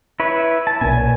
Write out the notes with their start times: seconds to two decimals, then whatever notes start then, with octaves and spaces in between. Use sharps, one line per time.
0.20 E4 B4 C#5
0.67 A5
0.81 B1 A#2 G#5